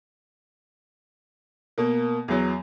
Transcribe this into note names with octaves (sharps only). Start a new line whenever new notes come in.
B2 A#3
E2 F#3